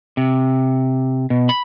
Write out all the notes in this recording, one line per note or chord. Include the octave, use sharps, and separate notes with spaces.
C3
B2
B5